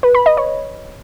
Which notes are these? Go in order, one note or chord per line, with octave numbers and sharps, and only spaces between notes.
B4
B5
D#5
C#5